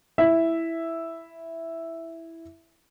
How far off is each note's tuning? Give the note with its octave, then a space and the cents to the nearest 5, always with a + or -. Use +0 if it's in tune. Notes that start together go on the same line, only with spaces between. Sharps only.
E4 +0 E5 +0